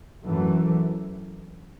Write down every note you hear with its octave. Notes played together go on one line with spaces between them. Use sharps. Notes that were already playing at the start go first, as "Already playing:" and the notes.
F#2 E3 A3